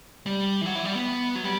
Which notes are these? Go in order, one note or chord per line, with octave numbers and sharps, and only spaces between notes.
G3
E3
F#3
E3
G3
B3
F#3
G3